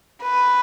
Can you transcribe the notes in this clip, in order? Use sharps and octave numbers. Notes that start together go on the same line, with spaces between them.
B4